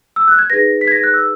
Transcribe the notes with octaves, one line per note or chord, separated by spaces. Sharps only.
E6
F#6
G#6
D#4 G#4 B4 A#6
B6
G#6
A#6
F#6
E6